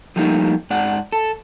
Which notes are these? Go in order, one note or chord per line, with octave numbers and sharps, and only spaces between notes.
F3 G3 A3 A#3 D#4
G#2 D5 F#5
A4